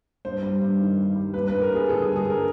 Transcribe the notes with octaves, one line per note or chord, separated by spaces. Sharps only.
G2 C5
G3
G2
D#3
G2
G3
G2 B4
B4
G3
A#4
G2 G#4
D3 A4
G#4
G2
G#4
G3
A#4